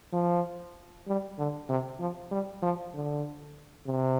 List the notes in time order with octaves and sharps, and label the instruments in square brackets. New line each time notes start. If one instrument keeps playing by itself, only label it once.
[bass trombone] F3
G3
D3
C3
F3
G3
F3
D3
C3